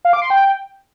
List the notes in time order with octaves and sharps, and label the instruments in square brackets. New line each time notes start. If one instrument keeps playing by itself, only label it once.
[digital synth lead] F5
D6
C6
G5